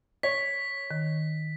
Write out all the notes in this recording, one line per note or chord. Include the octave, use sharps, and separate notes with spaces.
C#5 B6
D#3